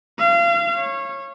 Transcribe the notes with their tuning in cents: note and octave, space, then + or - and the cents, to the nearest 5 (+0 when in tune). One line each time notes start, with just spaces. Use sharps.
F5 -30
C#5 -20